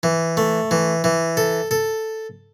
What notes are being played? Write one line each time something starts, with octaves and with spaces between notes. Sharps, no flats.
E3
A3
E3
E3
A4
A4